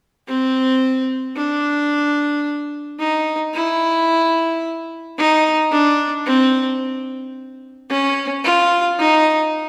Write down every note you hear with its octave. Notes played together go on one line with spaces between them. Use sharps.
C4
D4
D#4
E4
D#4
D4
C4
C#4
F4
D#4